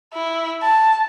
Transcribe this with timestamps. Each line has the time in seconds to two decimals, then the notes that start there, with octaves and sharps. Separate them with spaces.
0.13 E4
0.63 A5